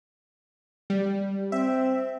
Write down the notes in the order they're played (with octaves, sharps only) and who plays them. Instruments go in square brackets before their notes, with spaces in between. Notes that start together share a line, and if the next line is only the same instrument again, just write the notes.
[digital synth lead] G3
[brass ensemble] C4 [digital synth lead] E5